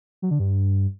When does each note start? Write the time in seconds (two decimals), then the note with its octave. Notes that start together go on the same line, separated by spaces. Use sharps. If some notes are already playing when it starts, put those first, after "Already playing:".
0.22 F#3
0.31 D3
0.39 G2